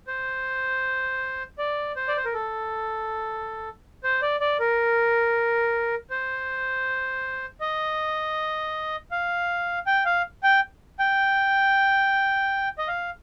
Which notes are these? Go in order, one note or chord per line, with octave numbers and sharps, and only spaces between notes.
C5
D5
C5
D5
C5
A#4
A4
C5
D5
D5
A#4
C5
D#5
F5
G5
F5
G5
G5
D#5
F5